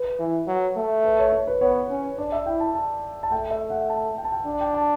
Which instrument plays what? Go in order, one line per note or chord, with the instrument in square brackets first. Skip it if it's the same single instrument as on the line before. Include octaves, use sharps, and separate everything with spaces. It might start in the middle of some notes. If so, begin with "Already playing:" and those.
Already playing: [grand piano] B4
[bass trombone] E3
F#3
A3
[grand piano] B4
C#5
C#5
B4
[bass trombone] B3 [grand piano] C#5
[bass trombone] C#4
[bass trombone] D4 [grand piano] D5
[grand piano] E5
[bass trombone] E4 [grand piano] G5
[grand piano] A5
A5
A5
[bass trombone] A3 [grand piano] G5
[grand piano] E5
F#5
A5
G5
A5
G5
[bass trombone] D4
[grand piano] G5
A5